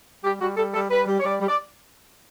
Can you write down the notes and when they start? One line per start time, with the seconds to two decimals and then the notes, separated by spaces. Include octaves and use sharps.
0.24 G3 G4
0.41 G3 F#4
0.57 G3 A4
0.74 G3 A4
0.90 G3 B4
1.07 G3
1.20 C#5
1.24 G3 D5
1.41 G3
1.48 D5